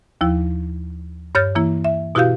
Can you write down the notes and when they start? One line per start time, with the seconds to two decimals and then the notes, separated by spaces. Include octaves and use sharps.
0.21 D#2 F3 E4
1.35 G2 C#5 F6 G6 A6
1.55 E3 A#3 E4
1.85 E5
2.15 B2 E4 F#4 G4 F5 G6